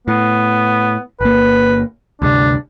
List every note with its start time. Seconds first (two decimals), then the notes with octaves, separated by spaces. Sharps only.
0.08 A2 B3
1.21 G1 A#3 B4
2.22 D2 G2 C3 D4